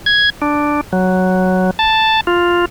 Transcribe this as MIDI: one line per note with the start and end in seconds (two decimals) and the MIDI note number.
0.06 0.30 92
0.42 0.81 62
0.93 1.71 54
1.79 2.21 81
2.27 2.65 65